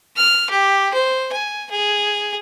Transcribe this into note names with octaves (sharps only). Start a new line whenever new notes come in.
F6
G4
C5
G#5
G#4